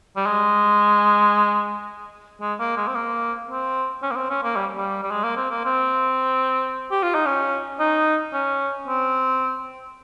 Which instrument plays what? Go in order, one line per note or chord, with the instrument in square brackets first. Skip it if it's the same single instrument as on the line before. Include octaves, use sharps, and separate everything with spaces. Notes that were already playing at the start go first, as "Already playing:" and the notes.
[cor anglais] G3
G#3
G#3
A#3
G#3
C4
A#3
C4
C#4
A#3
C4
C#4
A#3
G3
G3
G3
G#3
A#3
C4
A#3
C4
G4
F4
D#4
C#4
D#4
C#4
C4